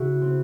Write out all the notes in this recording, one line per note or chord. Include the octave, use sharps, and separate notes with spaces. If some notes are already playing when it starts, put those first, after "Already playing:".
Already playing: C#3 E4 F#4 G#4
C4